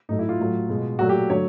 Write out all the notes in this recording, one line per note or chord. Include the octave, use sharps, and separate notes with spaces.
A2 F#3 A3 D#4
E4
F4
A2 F#3 A3
B2 G#3
A#2 F#3 A3 F#4
G4
D3 F#3 A3 C#5